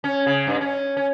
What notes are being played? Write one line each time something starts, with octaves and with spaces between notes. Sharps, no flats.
C#4
C#3
G2
C#4
C#4